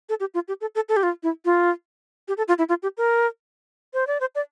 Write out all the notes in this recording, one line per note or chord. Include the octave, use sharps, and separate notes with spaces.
A4
G4
F4
G4
A4
A4
A4
G4
F4
E4
F4
G4
A4
F4
E4
F4
G4
A#4
C5
D5
C5
D5